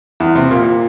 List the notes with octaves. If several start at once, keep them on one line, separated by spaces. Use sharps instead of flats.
E2
C3
A#2